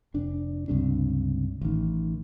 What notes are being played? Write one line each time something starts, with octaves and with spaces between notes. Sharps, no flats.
F1 D4
C#2 G2 C3 D4
A1 D#3